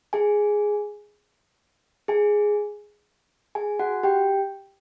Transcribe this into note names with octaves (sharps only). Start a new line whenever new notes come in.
G#4 G#5
G#4 G#5
G#4 G#5
F#4 F#5
G4 G5